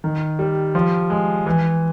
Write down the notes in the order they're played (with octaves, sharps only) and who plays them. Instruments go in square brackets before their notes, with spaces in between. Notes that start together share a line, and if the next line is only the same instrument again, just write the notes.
[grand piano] D#3
G3
F3
G#3
E3